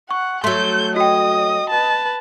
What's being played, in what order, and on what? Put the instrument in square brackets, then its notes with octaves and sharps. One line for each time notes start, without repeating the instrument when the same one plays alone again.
[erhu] F#5 [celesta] C#6
[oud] F#3 A3 [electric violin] A4 [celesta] C6 [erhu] G6
[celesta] F#4 G5 [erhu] D#5 [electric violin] D#6
[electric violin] B4 A5